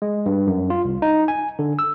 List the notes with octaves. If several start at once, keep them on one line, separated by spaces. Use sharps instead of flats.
G#3
G2
F#2
F4
C2
D#4
G#5
D3
E6